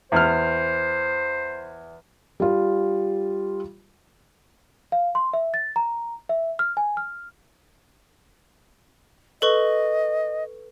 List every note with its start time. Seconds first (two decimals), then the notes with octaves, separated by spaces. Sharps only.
0.12 E2 C5 F6
2.40 G3 F4
4.92 F5
5.15 C6
5.33 E5
5.54 A6
5.76 A#5
6.29 E5
6.59 F6
6.77 G#5
6.97 F6
9.42 A4 B4 D#5 C#6